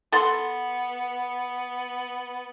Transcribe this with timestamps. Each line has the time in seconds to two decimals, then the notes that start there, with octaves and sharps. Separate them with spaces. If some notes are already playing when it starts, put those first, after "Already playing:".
0.12 B3 A4 F#5 C6